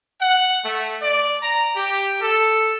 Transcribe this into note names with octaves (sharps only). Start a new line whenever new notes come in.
F#5
A3
D5
A#5
G4
A4